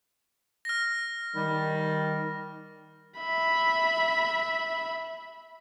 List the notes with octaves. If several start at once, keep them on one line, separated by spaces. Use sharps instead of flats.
F6 A#6
D#3 G3
E5 B5